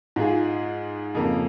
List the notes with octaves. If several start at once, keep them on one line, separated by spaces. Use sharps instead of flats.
G#2 G#3 F4 G#4
F2 C#3 A#3